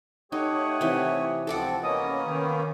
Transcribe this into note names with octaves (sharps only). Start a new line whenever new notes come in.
A3 D#4 G4 C#5 F#5 D#6
C3 E3
C#2 F3 C4 A4 D5 F#5
A#3 B3 C#4 D#5 D#6
D#3